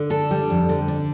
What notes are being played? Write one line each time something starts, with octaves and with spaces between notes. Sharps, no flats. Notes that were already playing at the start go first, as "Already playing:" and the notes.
Already playing: D3
D4 A4
G3
F2
D3
D4